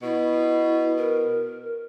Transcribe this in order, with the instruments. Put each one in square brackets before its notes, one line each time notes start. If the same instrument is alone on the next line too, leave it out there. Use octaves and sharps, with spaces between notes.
[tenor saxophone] B2 [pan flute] E4
[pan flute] A#4